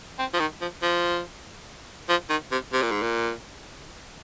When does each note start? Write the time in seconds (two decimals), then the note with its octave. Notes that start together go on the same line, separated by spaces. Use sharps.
0.19 C4
0.34 F3
0.40 D#3
0.61 F3
0.82 F3
2.09 F3
2.30 D#3
2.52 C3
2.73 C3
2.82 A#2
2.92 G#2
3.02 A#2